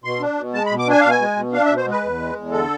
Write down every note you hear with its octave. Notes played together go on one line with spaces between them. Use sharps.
B2 C6
D4
B2
G#3 A5
B5
B2
D6
D4 G#5
B2 F5
G#5
G#3
B2
D4 F5
E5
B2
C5
G#3 B4
E2
G#3
E2
D3 A4